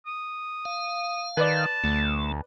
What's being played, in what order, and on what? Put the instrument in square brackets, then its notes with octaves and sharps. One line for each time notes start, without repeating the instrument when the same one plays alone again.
[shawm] D#6
[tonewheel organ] F5
[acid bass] D#3 [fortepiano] B4 D5 [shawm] A5
[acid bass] D2 [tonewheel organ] A3